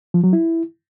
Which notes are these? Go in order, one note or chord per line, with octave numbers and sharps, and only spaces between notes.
F3
F#3
E4